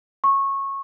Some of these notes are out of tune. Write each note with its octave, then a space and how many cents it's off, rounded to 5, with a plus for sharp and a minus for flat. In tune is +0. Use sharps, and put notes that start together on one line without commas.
C#6 -20